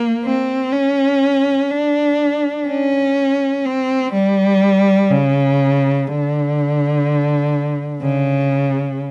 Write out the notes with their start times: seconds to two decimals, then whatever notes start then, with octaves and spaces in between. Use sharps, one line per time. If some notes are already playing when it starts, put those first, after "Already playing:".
Already playing: A#3
0.24 C4
0.72 C#4
1.71 D4
2.67 C#4
3.65 C4
4.13 G3
5.10 C#3
6.07 D3
8.01 C#3